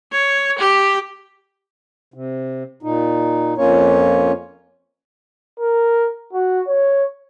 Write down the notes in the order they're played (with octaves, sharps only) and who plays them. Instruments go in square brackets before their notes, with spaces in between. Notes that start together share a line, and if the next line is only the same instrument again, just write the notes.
[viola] C#5
G4
[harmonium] C3
A#2 D#4
F2 A#3 C#4 F4 C#5
[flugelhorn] A#4
F#4
C#5